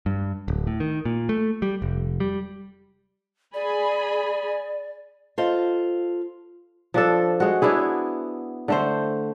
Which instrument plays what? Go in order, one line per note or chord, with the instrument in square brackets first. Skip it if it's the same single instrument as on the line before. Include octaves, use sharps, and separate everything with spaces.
[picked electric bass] G2
D1
A2
D#3
A#2
A3
G3
F1
G3
[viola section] G#4 G#5 B5 [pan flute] D5
[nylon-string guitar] F4 A4 C5 D#5 F5
[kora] F3 D4 A4
G#3 F#4
B3 D4 E4 G#4
D3 A3 C5